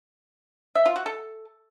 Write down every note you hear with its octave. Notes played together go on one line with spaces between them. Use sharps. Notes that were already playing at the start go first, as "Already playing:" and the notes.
E5
F4
F#4
A4